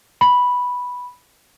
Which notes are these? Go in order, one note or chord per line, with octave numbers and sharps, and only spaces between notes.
B5